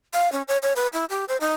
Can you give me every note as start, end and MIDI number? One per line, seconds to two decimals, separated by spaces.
0.14 0.30 77
0.32 0.42 61
0.48 0.57 73
0.63 0.73 73
0.76 0.87 71
0.93 1.05 64
1.10 1.25 67
1.28 1.37 72
1.41 1.53 63